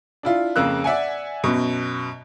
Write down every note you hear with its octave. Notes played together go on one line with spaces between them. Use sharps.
D4 E4 F4
F2 C#3 A#3 E6 F#6
D5 E5 F#5 G#5
F#2 B2